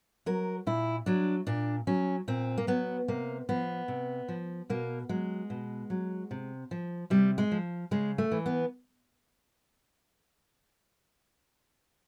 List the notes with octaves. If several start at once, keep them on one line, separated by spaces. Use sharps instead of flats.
F#3 A#4
A#2 E4
F#3 D4
A#2 D4
F#3 C#4
A#2 C4
A#3
F#3 B3
C3 A#3
F3 B3
C3
F3
B2 A#3
F#3 G#3
B2
F#3
C3
F3
C3 G3
G#3
F3
C#3 G#3
A3
E3
B3